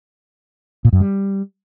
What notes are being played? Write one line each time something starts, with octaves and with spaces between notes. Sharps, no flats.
A#2
F#2
G3